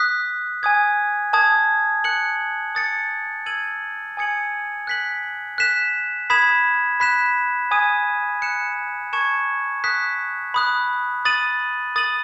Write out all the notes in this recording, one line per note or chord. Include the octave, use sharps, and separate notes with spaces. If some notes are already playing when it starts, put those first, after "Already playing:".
Already playing: D#6 F#6 B6
G#5 D#6 G#6
A5 D#6 G#6
F#6 C#7 F#7
D#6 A6 C#7
E6 G#6 D#7 F#7
G#5 D#6 G#6 C#7 F#7
F#6 B6 F#7
F#6 B6 E7
B5 D#6 G#6 B6 E7
B5 F#6 B6 E7
G#5 D#6 G#6 D#7
F#6 C#7 E7
A5 C#6 G#6 C#7 E7
D#6 F#6 B6 E7
B5 D#6 F#6
D#6 A6 D#7 F#7
D#6 A6 D#7 F#7